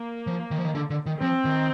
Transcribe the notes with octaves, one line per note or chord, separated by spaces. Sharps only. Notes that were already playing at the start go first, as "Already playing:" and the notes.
Already playing: A#3
F3
D#3
F3
D#3
D3
D3
D#3
F3 C4
D#3